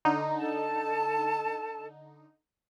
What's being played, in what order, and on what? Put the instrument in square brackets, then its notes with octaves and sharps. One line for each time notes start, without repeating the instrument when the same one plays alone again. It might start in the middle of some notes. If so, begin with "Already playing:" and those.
[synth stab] D3 D#4
[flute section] A4 A5